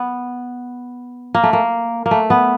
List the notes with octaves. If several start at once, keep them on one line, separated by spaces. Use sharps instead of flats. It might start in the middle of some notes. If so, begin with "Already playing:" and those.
Already playing: B3
A#3
A3
A#3
A#3
A3
B3